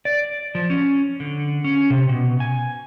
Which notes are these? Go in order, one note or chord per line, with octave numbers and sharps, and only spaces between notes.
D5
F3
C#4
D3
C#4
C3
B2
G#5